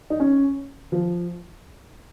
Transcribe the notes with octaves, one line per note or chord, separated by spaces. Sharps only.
D#4
C#4
F3